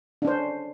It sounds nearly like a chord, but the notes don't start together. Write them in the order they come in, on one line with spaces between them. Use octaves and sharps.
D4 C#4 C5